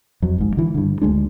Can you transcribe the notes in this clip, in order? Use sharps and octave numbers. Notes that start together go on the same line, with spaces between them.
F2 F#3
G#1 G#2
D3 E3
G2 D3
D2 G#3 D4